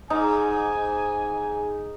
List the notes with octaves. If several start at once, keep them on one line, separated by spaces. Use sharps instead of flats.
G#2 D#4 G#5